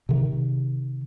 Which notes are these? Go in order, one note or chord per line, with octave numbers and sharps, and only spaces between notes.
C3 D#3